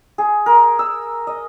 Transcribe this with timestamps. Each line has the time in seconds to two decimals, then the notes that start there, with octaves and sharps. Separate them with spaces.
0.18 G#4
0.46 A#4
0.79 E6
1.27 D#5